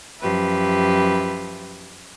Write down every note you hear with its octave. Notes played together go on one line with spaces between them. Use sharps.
F#2 F3 G4 B4 E5